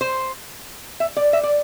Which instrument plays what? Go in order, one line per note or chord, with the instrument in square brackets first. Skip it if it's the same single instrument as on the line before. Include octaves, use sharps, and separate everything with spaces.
[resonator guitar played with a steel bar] C5
E5
D5
E5
D5